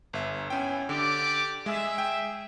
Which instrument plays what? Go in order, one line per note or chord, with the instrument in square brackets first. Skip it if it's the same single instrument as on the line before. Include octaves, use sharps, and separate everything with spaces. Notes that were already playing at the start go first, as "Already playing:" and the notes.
[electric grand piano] G1 E5
[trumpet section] B3 E4 G#5 [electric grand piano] C#4 G5
[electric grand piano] D3 [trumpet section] G4 D5 D6
[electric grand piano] G#3 [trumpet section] G#4 E5
[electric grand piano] G5